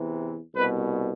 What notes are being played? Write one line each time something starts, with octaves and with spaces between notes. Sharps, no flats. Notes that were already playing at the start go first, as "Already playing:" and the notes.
Already playing: E2 C3 E3
C2 B2 B4